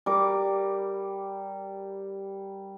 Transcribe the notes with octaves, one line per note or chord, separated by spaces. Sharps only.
G3 A#4 D6